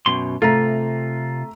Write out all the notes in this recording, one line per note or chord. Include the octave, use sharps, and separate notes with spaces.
F#2 B2 C6
C3 A3 F4 A#5